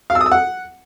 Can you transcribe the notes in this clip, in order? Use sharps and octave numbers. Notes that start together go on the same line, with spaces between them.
F5
E6
D#6
E6
F#5